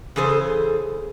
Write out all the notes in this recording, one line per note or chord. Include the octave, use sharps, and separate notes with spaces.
C#3 E3 G#4 A4 C5